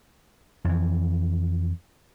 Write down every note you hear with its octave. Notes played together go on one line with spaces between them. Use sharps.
F2 E3